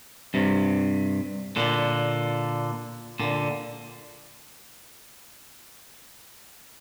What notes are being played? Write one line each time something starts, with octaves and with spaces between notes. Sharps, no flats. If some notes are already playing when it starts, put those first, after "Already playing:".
G2 C3
A#2 D3
A#2 D3